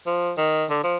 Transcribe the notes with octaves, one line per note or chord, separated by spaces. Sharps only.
F3
D#3
D3
F3